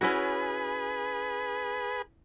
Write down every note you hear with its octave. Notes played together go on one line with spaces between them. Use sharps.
C#4 E4 F#4 G#4 B4